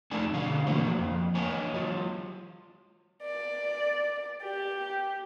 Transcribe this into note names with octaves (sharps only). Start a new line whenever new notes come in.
F2 A3 D4 D#4 A4 G#5
B2 D3 D4 F5
E3 F3 A3 A#3 F#4 C5
F2
A#3 C#5 D#5 G#5 A5
F#3 F4
D5
G4